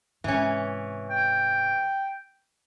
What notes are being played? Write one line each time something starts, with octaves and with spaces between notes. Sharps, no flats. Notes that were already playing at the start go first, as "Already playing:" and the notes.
G#2 C3 E3 C#4
G5